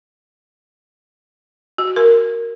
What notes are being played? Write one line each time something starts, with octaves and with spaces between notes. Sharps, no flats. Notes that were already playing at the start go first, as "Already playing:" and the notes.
F#4
A#4